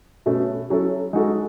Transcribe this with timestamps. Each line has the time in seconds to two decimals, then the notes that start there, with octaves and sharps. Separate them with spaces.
0.26 B2 A3 C#4
0.70 F#3 C#4 E4 A4
1.13 G#3 D#4 F#4 A4